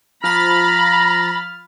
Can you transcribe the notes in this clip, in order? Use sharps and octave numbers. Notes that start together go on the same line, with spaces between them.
F3 A#5 B5 F6 A6